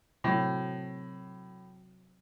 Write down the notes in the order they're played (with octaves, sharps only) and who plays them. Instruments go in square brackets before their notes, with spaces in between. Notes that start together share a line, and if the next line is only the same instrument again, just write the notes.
[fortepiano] A2 [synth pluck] C3 F#3 C4